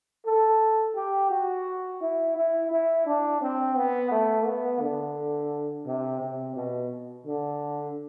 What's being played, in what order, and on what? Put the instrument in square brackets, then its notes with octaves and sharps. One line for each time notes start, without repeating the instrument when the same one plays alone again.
[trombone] A4
G4
F#4
E4
E4
E4
D4
C4
B3
A3
B3
D3
C3
C3
B2
D3